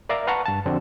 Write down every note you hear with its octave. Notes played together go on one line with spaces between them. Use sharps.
A#4 D5 E5 F5 A#5 F6
B4 F5 F#5 A5 A#5 C#6
G2 A5
F2 D3 C4 D4 F#4